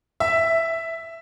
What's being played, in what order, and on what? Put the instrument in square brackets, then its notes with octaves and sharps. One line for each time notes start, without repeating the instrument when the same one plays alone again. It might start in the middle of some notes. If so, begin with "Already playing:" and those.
[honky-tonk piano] E5